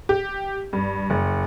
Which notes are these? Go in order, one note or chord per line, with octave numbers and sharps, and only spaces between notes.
G4
G2
F#1